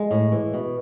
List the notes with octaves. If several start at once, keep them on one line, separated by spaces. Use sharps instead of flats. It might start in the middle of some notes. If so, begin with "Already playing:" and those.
Already playing: G#3
A2
E3
B2